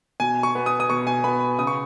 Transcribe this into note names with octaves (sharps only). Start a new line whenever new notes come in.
B2 G#5
C#6
B3
D#6
D#6
B2 C#6
G#5
B3 B5
C#3 D#6
C#6